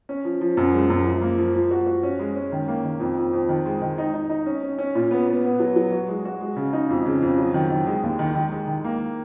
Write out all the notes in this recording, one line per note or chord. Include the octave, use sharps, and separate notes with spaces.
C#4
F3
F3
F#2
G#3
F#2
F3
A#3
F3
F3
F#4
F#4
C#4
G#3
C#4
D#3
A#3
D#3
F2
F2
F2
D#3
G#3
D#3
D#4
D#4
D#4
C#4
C#4
C#4
A#2
B3
B3
B3
F#3
F#3
F#4
G#3
F#4
G#3
C#3
D#4
F2
C#3
F2
F#3
D#3
D#3
G#3
D#2
D#3
D#3
G#3
D#3
A#3